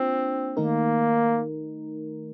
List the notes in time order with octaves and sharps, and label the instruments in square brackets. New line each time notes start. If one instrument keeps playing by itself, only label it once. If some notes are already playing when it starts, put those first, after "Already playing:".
Already playing: [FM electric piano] A#3 D4 F4 [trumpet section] C4
[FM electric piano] D#3 A3 D#4 A#4 [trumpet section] A#3